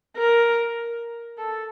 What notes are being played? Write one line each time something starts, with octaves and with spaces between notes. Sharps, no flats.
A#4
A4